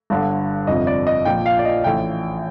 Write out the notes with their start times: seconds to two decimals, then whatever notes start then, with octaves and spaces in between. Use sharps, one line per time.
0.10 G1 G2 D3
0.67 G1 F2 C3 F3 D#5
0.87 D5
1.07 D#5
1.25 A#1 A#2 F3 G5
1.46 F5
1.59 D5
1.65 D#5
1.84 A1 A2 F3 G5